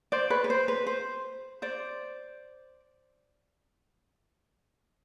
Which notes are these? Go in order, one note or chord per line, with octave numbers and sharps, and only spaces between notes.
C5 D5
B4 C#5
B4
C5
B4
C5
C5 D5